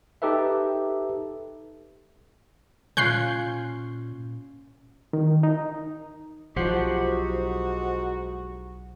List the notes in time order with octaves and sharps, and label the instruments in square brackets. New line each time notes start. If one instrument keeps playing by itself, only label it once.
[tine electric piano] D#4 G4 A4 B4 E5
[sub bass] A#2 [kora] C#4 F4 [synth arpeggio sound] F#6 G6 C7
[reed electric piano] D#3
D#4
[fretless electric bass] B1 F3 [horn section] G#2 D#4 F#4 [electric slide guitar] G4 C5 F#5